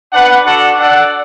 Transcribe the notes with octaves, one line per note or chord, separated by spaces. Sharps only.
D4 B4 F#5
D4 F#4 A4 D5 F#5
D4 A4 D5 F#5